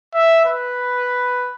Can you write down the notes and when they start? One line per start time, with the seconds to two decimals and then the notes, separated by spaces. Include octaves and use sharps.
0.14 E5
0.45 B4